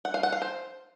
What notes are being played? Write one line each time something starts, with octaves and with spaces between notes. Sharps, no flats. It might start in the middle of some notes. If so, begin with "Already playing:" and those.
F#5
F5
F#5
F5
C5